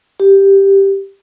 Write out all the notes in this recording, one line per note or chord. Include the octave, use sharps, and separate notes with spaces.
G4